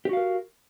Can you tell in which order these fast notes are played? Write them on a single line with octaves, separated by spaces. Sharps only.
G4 F#4 F5 A#4